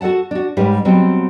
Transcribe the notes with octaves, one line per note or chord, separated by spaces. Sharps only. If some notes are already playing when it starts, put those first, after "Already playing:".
F#4 A4 C#5 F#5 A5
D4 F#4
G#2 G3 C#4 G4 B4
B2 F#3 G3 C4